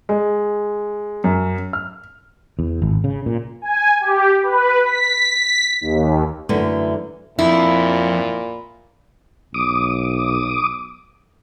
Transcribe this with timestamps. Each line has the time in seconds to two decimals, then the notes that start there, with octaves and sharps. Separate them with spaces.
0.09 G#3
1.24 F#2
1.73 F6
2.59 E2
2.82 G#1
3.04 C#3
3.26 A#2
3.62 G#5
4.01 G4
4.43 B4
4.85 B6
5.37 B6
5.81 D#2
6.49 F#2 D3 E3 A3
7.39 F2 A#2 E4
9.54 B1 D6 D#6